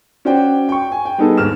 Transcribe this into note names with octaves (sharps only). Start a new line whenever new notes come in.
C#4 F#4 C5 D5 G5
G5 C#6
G#5
G5
G3 B3 D#4 G#4 A4
D#2 G#2 F6 E7